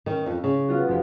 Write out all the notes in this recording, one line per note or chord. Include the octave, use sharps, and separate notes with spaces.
D#3 C#4
F2
C#3
B3 F4 F#4
F1 G4